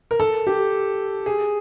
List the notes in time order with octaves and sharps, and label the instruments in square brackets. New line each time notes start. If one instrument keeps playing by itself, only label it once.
[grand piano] A#4
A4
G4
G#4